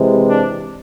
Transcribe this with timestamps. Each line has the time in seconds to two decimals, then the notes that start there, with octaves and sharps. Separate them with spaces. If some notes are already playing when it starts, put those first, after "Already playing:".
Already playing: C3 E3 G#3
0.27 D4